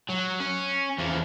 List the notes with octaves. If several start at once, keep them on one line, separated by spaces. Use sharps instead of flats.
F#3
C#4
E2 F3